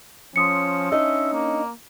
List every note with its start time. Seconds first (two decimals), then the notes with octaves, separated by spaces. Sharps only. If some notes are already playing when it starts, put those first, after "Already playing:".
0.36 F3 C#4 C6 D#6 C#7
0.92 D4 D#4 D#5 E5
1.33 A#3